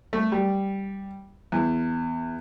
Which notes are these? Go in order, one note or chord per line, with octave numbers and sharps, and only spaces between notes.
A3
G3
E2